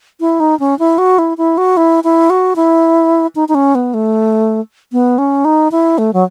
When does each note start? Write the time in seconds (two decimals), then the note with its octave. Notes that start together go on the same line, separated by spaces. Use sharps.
0.20 E4
0.40 D#4
0.60 C#4
0.79 E4
0.98 F#4
1.19 E4
1.38 E4
1.58 F#4
1.77 E4
2.04 E4
2.30 F#4
2.56 E4
3.35 D#4
3.48 D#4
3.55 C#4
3.75 B3
3.94 A3
4.92 B3
5.18 C#4
5.45 D#4
5.71 E4
5.98 A3
6.13 F#3